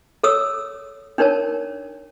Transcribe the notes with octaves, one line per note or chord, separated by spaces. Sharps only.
A4 C#5 D#6 E6
D4 D#4 A#4 C#5 A5